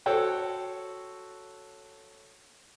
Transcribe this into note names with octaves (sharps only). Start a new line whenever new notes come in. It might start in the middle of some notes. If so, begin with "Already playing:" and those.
F#4 A4 C5 C#5 F#5 G5